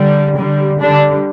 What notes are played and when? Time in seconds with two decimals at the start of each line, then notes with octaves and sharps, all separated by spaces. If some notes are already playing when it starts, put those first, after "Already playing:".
Already playing: D3 G3
0.35 D3 G3
0.80 D3 G3 D4